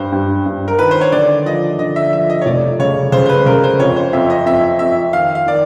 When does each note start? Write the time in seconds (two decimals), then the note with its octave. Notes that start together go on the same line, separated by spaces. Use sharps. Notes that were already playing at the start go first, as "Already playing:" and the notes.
Already playing: G2 C5
0.12 G2
0.46 G2
0.68 A#4
0.79 D#3 B4
0.91 C5
1.01 C#5
1.12 D3 D5
1.45 F3 D#5
1.79 D3 D#5
1.96 E5
2.13 F3 E5
2.30 D#5
2.42 C#5
2.46 F1 D5
2.79 C#3 C#5
3.12 C#3 C5
3.26 C5
3.29 B4
3.46 C#3 A#4
3.64 C5
3.80 F2 C#5
3.96 C5
4.13 F2 E5
4.30 D#5
4.46 F2 E5
4.79 F2 E5
5.13 D#3 F5
5.35 F5
5.46 D#3 D5